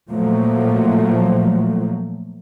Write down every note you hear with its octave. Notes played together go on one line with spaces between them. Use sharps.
A#2 F3 F#3 A3 A#3